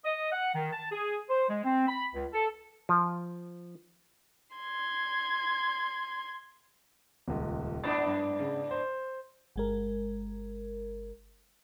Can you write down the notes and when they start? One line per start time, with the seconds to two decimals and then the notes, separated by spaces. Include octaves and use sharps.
0.05 D#5
0.32 F#5
0.55 D#3
0.73 A5
0.92 G#4
1.30 C5
1.49 G#3
1.64 C4
1.88 B5
2.14 C#2
2.33 A4
2.89 F3
4.56 C6 G#6
7.28 D#1 C#2
7.84 G#2 B3 D4 A6
8.06 G2
8.40 C#3
8.71 C5
9.56 G1 G#3 A#4